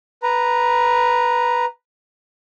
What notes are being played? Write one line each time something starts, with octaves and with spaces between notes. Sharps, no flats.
B4 A#5